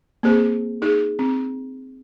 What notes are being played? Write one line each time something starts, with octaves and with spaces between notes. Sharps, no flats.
A#3 C4 G#4 C5
D#4 G#4
C4